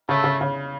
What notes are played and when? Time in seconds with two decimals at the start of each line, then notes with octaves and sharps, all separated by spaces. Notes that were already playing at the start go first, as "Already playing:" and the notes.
0.08 C#3 A3
0.24 C#3
0.41 C#3